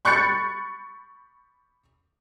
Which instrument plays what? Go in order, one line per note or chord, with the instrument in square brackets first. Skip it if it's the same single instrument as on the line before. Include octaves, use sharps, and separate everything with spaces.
[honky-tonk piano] B5 C#6 F#6 G6 A6 C#7